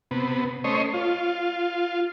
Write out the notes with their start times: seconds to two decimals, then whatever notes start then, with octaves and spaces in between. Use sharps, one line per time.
0.11 C3 B3
0.64 A3 C#4 C5 C#5 D#5
0.94 F4